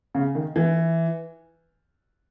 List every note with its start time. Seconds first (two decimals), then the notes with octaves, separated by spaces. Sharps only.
0.15 C#3
0.35 D#3
0.56 E3